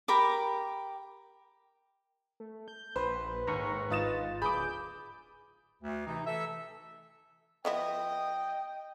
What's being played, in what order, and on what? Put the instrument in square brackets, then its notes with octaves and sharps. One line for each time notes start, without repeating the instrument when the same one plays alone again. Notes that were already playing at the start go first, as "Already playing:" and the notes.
[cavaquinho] G4 A#4 B5 D6
[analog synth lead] A3
G6
[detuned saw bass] A#1 [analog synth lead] B4 [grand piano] C5
[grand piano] D#2 [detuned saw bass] G#2 [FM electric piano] A#5 C#6
[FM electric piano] G#1 F4 A6 [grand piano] D#4 D#6 E7
[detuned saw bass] D1 [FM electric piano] G#4 D6 [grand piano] B5 D#6 [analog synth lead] G6
[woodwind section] D2
C3 E3 D#4
E3 A4 E5
[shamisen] F3 B3 E4 [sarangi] D#5 [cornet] G5